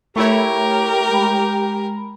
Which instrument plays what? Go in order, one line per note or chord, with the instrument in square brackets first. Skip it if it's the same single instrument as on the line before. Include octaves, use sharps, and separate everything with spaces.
[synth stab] A3 E4 C#5 [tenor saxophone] G4 [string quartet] A#4
[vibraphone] G#3 B5